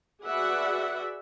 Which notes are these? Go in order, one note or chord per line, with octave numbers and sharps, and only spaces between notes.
F#4 G#4 B4 D5 E5 F#5